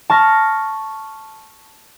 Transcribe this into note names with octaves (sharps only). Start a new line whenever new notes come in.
A5 C#6 F6 A#6